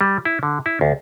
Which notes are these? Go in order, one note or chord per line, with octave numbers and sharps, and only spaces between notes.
G3
E4
D3
E4
D2